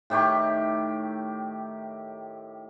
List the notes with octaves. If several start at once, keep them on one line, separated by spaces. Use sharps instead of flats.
A2 D#3 G4 C#6